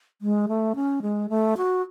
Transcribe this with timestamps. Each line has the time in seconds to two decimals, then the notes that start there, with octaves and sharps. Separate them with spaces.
0.22 G#3
0.48 A3
0.75 C#4
1.02 G#3
1.30 A3
1.57 F#4